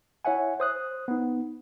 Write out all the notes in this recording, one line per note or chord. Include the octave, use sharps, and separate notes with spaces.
E4 C#5 E5 F#5 G#5
C5 D#6 F#6
B3 D#4